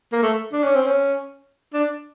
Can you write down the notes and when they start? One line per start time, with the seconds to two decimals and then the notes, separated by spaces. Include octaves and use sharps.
0.12 A#3
0.23 A3
0.53 D4
0.64 C#4
0.76 C4
0.86 C#4
1.74 D4